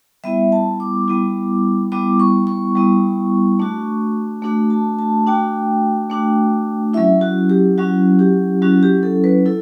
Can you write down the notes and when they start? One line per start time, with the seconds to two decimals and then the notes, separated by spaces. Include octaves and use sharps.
0.24 G3 B3 E4 E5
0.52 A5
0.80 D6
1.08 G3 B3 E4
1.92 G3 B3 E4 D6
2.20 C#6
2.47 C#6
2.75 G3 B3 E4
3.59 A3 D4 F#4
4.42 A3 D4 F#4
4.70 A5
4.99 A5
5.27 A3 D4 F#4 G5
6.10 A3 D4 F#4
6.94 F#3 C#4 E4 E5
7.21 F#4
7.50 G4
7.78 F#3 C#4 E4 F#4
8.19 G4
8.62 F#3 C#4 E4 F#4
8.83 G4
9.03 A4
9.24 B4
9.46 E4 A4